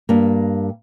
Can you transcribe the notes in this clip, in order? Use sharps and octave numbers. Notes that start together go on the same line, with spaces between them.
G2 A#3